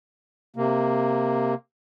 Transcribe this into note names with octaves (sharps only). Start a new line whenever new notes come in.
C3 A#3